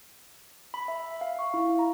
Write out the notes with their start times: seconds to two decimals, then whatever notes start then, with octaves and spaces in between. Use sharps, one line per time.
0.74 B5
0.88 E5
1.21 F5
1.39 C#6
1.54 E4
1.79 A#5